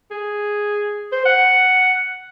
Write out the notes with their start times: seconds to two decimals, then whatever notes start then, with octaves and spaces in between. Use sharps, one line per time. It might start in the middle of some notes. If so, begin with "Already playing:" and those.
0.11 G#4
1.12 C5
1.25 F#5